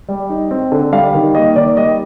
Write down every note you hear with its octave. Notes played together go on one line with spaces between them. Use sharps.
G3
D#4
C4
D3
G3 F5
D#3
A#3 D#5
D#3 D5
G3 D#5